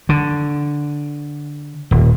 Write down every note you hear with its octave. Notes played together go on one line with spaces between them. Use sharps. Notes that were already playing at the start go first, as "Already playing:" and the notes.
D3
D#1